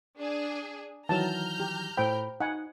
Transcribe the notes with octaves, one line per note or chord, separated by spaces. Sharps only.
D4 G#4
D#3 E3 F#3 A5 A#5 F6 G6
G4
A2 C5 G5 B5
D#4 F#5 G#5